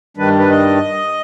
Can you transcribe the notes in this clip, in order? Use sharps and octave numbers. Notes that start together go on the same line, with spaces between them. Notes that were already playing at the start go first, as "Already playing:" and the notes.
G2 D#3 G3 D4 B4
B4
D#5